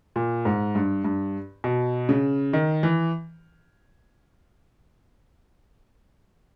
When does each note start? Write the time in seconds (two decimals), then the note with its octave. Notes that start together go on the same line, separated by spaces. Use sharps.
0.16 A#2
0.45 G#2
0.75 G2
1.04 G2
1.64 B2
2.09 C#3
2.53 D#3
2.83 E3